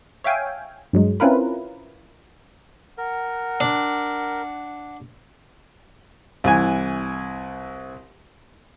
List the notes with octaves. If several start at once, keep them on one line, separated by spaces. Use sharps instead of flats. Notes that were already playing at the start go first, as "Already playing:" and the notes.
C#5 E5 F5 G5 G#5
G2 F#3 G#3
C4 C#4 E4 F4 A#4 B4
A#4 F#5
D4
C2 E3 G#5